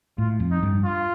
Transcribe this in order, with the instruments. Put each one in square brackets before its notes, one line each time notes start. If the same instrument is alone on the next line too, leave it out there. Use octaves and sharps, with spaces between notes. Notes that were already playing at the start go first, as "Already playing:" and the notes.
[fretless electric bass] A2 [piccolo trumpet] F4
[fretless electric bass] F2
[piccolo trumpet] D#4
[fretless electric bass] G2
[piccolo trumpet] F4